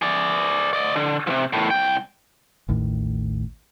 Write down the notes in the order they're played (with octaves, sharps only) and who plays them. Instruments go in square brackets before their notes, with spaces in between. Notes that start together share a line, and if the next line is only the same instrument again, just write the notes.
[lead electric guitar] G#4 D5
D5 D#5
D3
C3 F3
E2 A2
C2 G5
[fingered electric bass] A1 D#2 A2